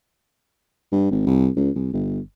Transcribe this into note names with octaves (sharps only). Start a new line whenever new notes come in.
G2
G#1
C2
C#2
C2
G1